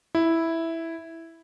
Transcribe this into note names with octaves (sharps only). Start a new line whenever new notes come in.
E4